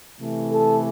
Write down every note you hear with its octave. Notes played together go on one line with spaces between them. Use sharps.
C3 E3 A3
A4